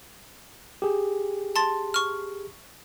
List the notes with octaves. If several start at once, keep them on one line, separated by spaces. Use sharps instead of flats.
G4 G#4
A5 C6 A6
C#6 F6